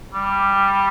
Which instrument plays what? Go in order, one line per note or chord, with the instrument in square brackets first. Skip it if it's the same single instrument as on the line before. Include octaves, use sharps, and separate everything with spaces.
[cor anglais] G3